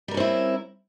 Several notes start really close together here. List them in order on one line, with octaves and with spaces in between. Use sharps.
G3 A#4 C#4 C4 E4